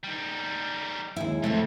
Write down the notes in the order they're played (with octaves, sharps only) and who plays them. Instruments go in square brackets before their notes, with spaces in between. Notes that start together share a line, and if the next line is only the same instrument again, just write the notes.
[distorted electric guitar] G3 D#4
[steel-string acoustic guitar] D#2 G#3 E4
[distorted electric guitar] F2 [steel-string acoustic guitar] A2 C3 A3